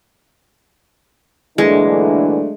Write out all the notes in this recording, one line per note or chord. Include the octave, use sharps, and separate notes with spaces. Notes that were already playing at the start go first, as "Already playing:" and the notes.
A#2 D3 E3 F#3 G#3 A3 D4